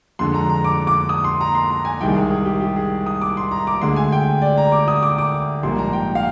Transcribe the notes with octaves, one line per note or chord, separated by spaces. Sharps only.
F2 D3 G#3 C6
A#5
A#5
D6
D6
D#6
C6
A#5
C6
A#5
G#5
C2 C3 D#3 G#3 G5
G#4
G#4
G4
G4
G#4
D#6
D6
C6
A#5
D6
D2 D3 G#3 C6
G#5
G5
D5
A#5
D6
D#6
D6
D6
A#1 G#2 G3 A#3 C6
A#5
G5
F5